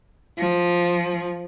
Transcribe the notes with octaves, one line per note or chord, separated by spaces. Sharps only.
F3